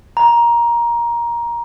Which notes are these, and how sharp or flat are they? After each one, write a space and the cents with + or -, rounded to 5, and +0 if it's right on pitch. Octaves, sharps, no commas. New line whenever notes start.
A#5 +15